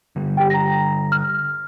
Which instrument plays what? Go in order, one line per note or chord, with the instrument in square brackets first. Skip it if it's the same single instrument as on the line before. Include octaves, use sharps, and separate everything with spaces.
[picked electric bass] D3 G3
[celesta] G4 G5
A#5 A#6
F6